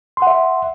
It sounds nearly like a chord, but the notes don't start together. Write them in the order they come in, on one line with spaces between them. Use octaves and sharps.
C6 F#5 E5